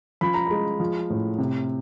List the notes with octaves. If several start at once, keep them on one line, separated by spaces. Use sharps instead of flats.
F3 B5
A#5
G#3 B5
F3
A2
C3